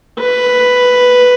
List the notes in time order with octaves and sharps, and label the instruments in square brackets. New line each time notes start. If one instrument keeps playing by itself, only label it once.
[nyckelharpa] B4